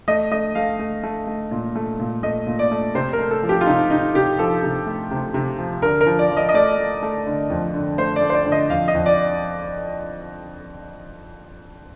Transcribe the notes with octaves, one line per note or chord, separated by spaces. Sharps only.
A3 D#5
A3 D#5
A3 F5
A3
A3
A3
A#2
A3
A#2
A3 D#5
A#2
D5
A3
C3 C5
A#4
A3
A4
F3
G4
F4
C3 D#4
C3 D#4
C3 G4
F3 A4
C3
A3
C3
C3
F3
D3 A#4
A#4
F3
D5
F3
D#5
D#5
A3 D5
A3
A3
D3
F2
D3
A3 C5
D5
A3
C5
D5
D3
D#5
F2 F5
D#5
F2
D5